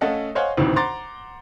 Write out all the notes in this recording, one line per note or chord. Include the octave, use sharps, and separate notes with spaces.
A3 C#4 A4 D#5 F5 F#5
C5 C#5 D#5 F5 F#5 G#5
G#1 D2 A2 C3 D#3 E3
C5 F#5 A#5 C6 D6 A6